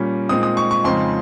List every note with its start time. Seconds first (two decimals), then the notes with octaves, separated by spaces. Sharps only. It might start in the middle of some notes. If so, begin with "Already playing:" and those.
Already playing: A#2 G3 C#4
0.29 A#2 G#3 C4 D#4 D#6
0.43 D#6
0.57 C#6
0.71 C#6
0.84 F2 C#3 G#3 C4 D#4 C6